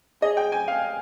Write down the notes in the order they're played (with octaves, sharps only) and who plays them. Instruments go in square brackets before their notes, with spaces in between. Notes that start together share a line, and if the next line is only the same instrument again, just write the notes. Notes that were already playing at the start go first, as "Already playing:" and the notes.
[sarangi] G#4 [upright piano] D#5
[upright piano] G5
G#5
F5